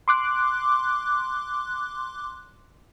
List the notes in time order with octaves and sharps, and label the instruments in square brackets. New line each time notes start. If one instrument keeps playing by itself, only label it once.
[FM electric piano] C6 D6 F#6